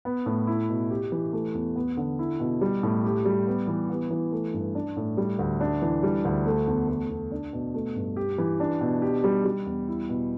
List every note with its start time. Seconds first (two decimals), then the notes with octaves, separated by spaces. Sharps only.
0.05 B3
0.26 A2
0.47 E4
0.69 B2
0.91 G4
1.12 E3
1.33 A3
1.54 E2
1.76 B3
1.97 D3
2.19 E4
2.40 B2
2.61 G3
2.83 A2
3.04 G4
3.25 G3
3.47 B3
3.68 E3
3.90 B3
4.11 E3
4.32 A3
4.54 G2
4.75 D4
4.97 A2
5.17 G3
5.39 D2
5.60 D4
5.82 E3
6.03 G3
6.25 D2
6.46 A3
6.67 E2
6.88 A3
7.10 E2
7.32 D4
7.53 B2
7.74 A3
7.96 G2
8.16 G4
8.38 E3
8.60 D4
8.81 B2
9.02 G4
9.24 G3
9.45 G3
9.66 E2
9.88 E4
10.09 B2